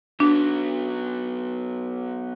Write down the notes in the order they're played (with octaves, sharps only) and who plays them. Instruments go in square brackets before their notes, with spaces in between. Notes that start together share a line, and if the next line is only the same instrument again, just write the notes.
[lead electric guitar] F#3 B3 [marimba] D4